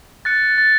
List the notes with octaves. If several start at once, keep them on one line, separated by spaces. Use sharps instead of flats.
F#6 A6 C#7
A6